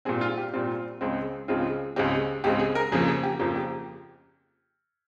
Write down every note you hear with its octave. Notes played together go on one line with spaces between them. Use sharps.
A#2 G3 C4 G#4
F4
G4
A#2 G3 C4 F4
C#2 C#3 G#3 C4
C#2 C#3 G#3 C4 F4
C#2 C#3 G#3 C4 G4
C#2 C#3 G#3 C4 G4
G#4
A#4
F2 C#3 F3 A#3 G#4
G#4
G4
F2 C#3 F3 A#3
G4